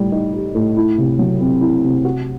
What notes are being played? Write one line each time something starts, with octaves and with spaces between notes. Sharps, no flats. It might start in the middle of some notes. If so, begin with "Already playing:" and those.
Already playing: A2 G3
D#4
G4
A2
E4
C3
F#3
C4
E4
C3
F#4